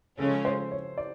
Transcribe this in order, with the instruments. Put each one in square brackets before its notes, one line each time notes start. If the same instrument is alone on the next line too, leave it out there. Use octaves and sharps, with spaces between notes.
[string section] C#3 F3 G#3 C#4 [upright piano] A4
[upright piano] C5
C#5
D5